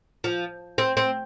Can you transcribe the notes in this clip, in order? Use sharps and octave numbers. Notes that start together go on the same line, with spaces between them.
F3
C4
C4